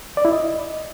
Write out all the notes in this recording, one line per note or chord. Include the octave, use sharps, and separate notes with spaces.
D5
E4
D#5